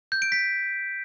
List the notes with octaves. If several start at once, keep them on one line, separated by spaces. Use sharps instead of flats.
G6
D7
B6